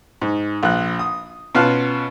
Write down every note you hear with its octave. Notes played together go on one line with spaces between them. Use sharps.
G#2
A#1 F#6
D#6
B2 C#4 F4 F5 A5 F#6